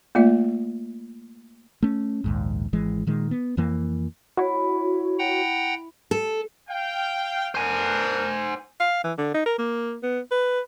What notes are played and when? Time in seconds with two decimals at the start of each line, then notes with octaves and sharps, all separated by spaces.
0.15 A3 A#3 F4 D5 E5
1.83 A3 C#4
2.24 A#1 D#2 G#2
2.73 G#1 E3 G#3
3.07 A#2 D#3 G#3
3.31 B3
3.57 F2 E3 A#3
4.37 E4 F#4 C#5
5.19 F#5 G5 A#5
6.11 A4
6.69 F5 G5
7.55 B3 D4 A#4 C5 G#5
8.80 F5
9.04 E3
9.18 D3
9.34 D#4
9.45 A#4
9.58 A#3
10.03 B3
10.31 B4